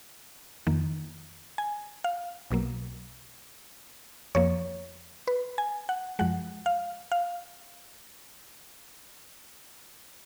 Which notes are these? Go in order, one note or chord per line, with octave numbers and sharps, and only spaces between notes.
F2 D#3 A#3
G#5
F5
B1 B2 F#3 A#3
F2 F3 A#3 C#5
B4
G#5
F#5
F#2 F3 G#3 F#5
F5
F5